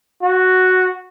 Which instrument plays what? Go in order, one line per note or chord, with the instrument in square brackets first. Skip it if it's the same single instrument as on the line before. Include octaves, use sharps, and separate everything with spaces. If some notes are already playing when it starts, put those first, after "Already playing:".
[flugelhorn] F#4